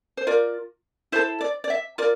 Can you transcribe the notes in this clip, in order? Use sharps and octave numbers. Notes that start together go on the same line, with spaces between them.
C5
F4 A#4 D5
E4 A4 C5
D5
D5
E5
F4 A#4 D5